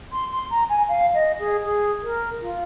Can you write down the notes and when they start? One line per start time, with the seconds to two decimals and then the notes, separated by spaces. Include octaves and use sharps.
0.12 C6
0.32 C6
0.51 A#5
0.70 G#5
0.89 F5
1.14 D#5
1.39 G#4
1.65 G#4
2.03 A#4
2.41 F4